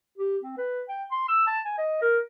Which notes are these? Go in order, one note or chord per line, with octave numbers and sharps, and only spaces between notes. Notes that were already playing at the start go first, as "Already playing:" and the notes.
G4
C4
B4
G5
C6
E6
A5
G#5
D#5
A#4